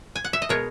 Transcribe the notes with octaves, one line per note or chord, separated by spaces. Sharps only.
G#5
F#5
E5
D#5
B2 G#3 B3 A#4 C#5